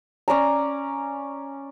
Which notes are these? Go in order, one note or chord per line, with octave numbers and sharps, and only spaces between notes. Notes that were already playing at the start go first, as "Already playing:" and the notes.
C#4 D5 G#5 A#5